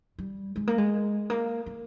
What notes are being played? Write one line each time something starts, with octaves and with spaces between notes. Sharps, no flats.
G3
G#3
A#3
G#3
A#3
A#3